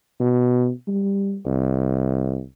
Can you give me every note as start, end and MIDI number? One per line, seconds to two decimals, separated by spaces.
0.20 0.71 47
0.88 1.38 55
1.46 2.43 36